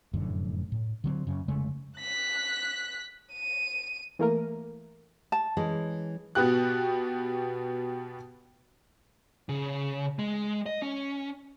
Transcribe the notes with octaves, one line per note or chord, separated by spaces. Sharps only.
F1 F#2 A2 D3
A2
D3 F#3 C4
F#2 C#3
F1 C#3 G#3 A3
F#6 B6
D#7
E3 A3 A#3 A#4
A5
E3 G#3 C#4
B2 B3 F#4 G4 F#6
C#3
G#3
D#5
C#4